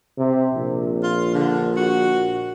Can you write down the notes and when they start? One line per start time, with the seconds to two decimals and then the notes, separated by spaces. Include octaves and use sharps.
0.18 C3
0.54 A#1
1.03 F4
1.35 D3
1.77 F#4